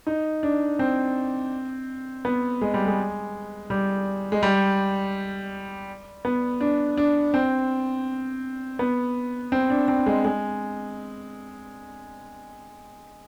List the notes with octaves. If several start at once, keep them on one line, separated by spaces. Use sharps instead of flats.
D#4
D4
C4
B3
G#3
G3
G#3
G3
G#3
G3
B3
D4
D4
C4
B3
C4
D4
C4
G#3
G#3